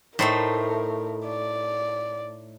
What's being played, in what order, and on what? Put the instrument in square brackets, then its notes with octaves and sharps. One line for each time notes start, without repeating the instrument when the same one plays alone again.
[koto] A2 [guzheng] A3 D#4 C5 [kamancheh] A#4
[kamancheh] D5